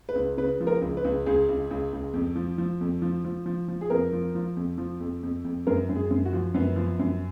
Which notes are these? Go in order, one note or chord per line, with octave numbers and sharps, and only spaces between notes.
B4
C#2
C#3 B4
F3
A#4
C#2
B4
C#2
C#2 G#4
C#2
C#2
C#2
F2
F3
F3
F2
F3
F3
F3
F3
G#4
F2 A#4
F3
F3
F2
F3
F2
F2
F2
F#2 A#4
F#2
G#4
F#2
F#4
F3
F#2 B3
F3
F#2